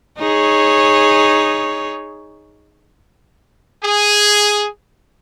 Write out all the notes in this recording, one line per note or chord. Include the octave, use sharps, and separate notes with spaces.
D#4 G#4 C#5
G#4